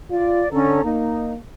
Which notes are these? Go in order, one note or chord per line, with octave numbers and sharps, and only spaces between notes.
F4 D5
D3 C#4 A4 A#5
A#3 D#4